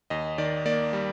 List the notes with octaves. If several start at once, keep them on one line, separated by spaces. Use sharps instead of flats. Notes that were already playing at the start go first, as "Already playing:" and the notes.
D#2 D#5
D#3 D5
A#3 D5
G3